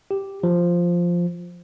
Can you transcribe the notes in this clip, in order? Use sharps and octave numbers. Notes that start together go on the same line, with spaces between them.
G4
F3